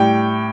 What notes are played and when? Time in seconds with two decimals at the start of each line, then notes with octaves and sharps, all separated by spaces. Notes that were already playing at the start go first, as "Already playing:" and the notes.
Already playing: A2 G3 G5